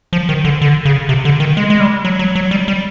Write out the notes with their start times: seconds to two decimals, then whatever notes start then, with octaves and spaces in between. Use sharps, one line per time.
0.13 F3
0.29 D#3
0.45 D3
0.62 D3
0.85 C#3
1.09 C3
1.25 D3
1.40 D#3
1.57 G#3
1.70 G#3
1.80 G3
2.05 F#3
2.19 F#3
2.35 F#3
2.51 G3
2.68 G3